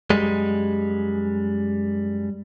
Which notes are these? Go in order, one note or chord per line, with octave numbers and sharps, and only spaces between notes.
F#2 G3 G#3